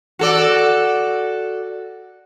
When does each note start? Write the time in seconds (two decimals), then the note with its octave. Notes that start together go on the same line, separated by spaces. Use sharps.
0.19 F#4 A4 D5